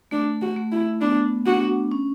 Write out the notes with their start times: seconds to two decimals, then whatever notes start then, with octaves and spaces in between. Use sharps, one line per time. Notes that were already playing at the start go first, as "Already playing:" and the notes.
0.11 A3 D4
0.42 F#4
0.56 A3
0.72 E4
1.01 B3 D4
1.46 D4 F#4
1.91 C#4